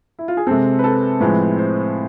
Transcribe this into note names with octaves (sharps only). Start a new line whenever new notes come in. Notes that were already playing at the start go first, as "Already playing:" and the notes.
E4
F4
G#4
C3 G#3 C4 A4
B4
A4
A2 F3 G#3 C4 B4
C5